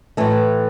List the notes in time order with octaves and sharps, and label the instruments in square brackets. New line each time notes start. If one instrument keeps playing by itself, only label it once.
[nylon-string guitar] A2 E3 A3